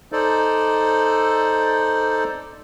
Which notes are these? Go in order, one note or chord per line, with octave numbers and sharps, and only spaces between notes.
D#4 A4 C5 D5